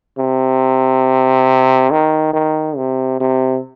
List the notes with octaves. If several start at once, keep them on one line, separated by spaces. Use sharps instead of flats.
C3
D#3
D#3
C3
C3